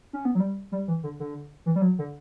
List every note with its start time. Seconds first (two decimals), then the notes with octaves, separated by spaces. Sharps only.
0.13 C#4
0.25 B3
0.35 F#3
0.40 G3
0.72 G3
0.88 E3
1.03 D3
1.20 D3
1.66 E3
1.76 G3
1.82 F#3
1.99 D3